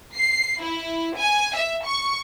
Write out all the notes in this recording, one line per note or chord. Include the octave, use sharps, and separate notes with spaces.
C7
E4
G#5
E5
C#6